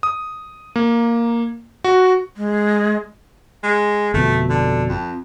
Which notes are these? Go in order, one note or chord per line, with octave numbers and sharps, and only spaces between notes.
D#6
A#3
F#4
G#3
G#3
G1 F2 B2 A3
D3
F2